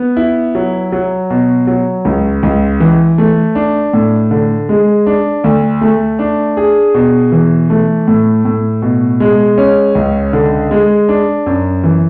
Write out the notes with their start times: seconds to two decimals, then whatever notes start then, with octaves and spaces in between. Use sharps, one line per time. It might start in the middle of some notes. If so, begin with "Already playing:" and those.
Already playing: B3
0.17 E4
0.55 F#3
0.92 F#3
1.30 B2
1.67 F#3
2.05 C#2
2.43 C#2
2.80 E3
3.18 A3
3.55 D4
3.93 A2
4.31 D3
4.69 G#3
5.06 D4
5.44 D2
5.81 A3
6.19 D4
6.57 G#4
6.94 B2
7.32 E3
7.70 A3
8.07 A2
8.45 A2
8.82 B2
9.20 G#3
9.58 C#4
9.95 C#2
10.33 D3
10.71 G#3
11.09 D4
11.46 F#2
11.84 E3